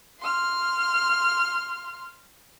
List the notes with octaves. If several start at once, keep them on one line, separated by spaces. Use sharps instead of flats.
C6 F6